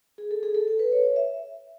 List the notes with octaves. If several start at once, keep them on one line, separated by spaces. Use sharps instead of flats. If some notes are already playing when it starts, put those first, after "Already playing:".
G#4
A4
G#4
A4
A4
B4
C#5
C#5
E5